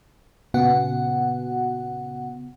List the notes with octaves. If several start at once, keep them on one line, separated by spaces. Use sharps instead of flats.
A#2 C#3 B3 F#4 F#5